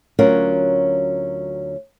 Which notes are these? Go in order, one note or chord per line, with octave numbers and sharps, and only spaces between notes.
D2 F#3 C#4 F4 A#4 F#5